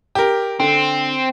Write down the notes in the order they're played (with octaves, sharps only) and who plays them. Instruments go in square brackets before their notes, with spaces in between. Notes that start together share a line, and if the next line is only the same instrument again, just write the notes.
[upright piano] G4 A#4
[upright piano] D3 [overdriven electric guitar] C4